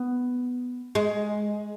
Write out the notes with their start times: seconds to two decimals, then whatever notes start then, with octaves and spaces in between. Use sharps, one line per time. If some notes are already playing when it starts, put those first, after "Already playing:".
Already playing: B3
0.95 G#3